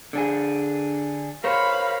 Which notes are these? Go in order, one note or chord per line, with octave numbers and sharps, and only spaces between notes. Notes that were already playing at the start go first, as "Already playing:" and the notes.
D3 D4 G#4
A#4 C5 C#5 F5 B5